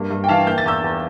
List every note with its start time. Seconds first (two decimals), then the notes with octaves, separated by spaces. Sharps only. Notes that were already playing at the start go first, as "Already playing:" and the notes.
Already playing: G2 A#3
0.11 G2
0.24 G5
0.29 E3 F5 A5
0.47 A#3 G6
0.58 A6
0.66 E2 E6 G6
0.84 E2